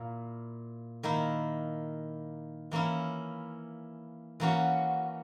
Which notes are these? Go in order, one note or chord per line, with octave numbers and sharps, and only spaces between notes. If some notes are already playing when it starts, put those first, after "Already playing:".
Already playing: A#2 A#3 E4
D#3 A#3 E4
E3 A#3 C#4 E4
E3 A#3 C#4 F#4